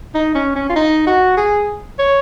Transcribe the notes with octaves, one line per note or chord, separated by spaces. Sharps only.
D#4
C#4
C#4
F4
D#4
F#4
G#4
C#5